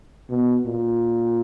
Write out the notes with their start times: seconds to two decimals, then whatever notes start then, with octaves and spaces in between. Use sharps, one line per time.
0.30 B2
0.67 A#2